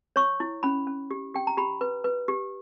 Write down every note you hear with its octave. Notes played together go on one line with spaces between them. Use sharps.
C#5 C#6
E4
C#4 B5
C#4
G4
G4 G5
A#5
G4 B5
B4
B4
G4